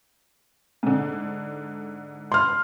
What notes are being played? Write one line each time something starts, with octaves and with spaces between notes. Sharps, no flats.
G#2 D3
C6 F6